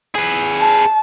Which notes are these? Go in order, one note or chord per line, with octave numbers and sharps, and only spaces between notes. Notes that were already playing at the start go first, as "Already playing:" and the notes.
G#4 B4
A5